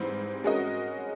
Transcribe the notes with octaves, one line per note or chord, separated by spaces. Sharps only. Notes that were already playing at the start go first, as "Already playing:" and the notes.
Already playing: G#2 E3 G3 C4
G#3 C#4 F#4 A#4 D#5